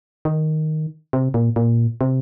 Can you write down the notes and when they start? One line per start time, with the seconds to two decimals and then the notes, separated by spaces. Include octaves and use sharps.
0.25 D#3
1.13 C3
1.34 A#2
1.56 A#2
2.01 C3